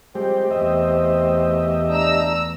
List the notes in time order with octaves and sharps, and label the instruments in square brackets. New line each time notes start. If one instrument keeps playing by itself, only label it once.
[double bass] F3 [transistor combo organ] G3 G#3 G4 [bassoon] C4
[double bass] E2 A3 [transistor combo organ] G4 D#5 E5
[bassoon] D4 [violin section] A#5 E6